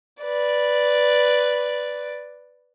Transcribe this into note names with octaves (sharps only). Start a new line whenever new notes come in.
B4 D5